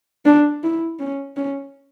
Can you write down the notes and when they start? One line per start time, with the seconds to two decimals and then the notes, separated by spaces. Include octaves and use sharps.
0.25 D4
0.63 E4
0.99 C#4
1.37 C#4